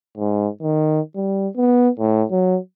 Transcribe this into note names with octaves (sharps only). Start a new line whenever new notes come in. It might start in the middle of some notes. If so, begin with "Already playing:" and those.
G#2
D#3
G3
B3
A2
F#3